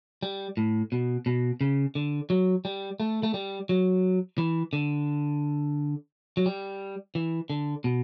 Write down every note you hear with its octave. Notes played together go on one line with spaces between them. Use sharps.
G3
A2
B2
B2
C#3
D3
F#3
G3
A3
A3
G3
F#3
E3
D3
F#3
G3
E3
D3
B2